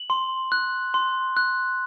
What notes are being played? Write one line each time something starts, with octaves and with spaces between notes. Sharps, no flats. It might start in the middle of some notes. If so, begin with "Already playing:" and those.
Already playing: F#7
C6
F#6
C6
F#6